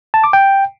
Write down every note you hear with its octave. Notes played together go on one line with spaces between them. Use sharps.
A5
D6
G5